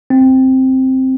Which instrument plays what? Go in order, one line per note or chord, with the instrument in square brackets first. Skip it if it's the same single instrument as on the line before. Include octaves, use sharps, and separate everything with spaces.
[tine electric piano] C4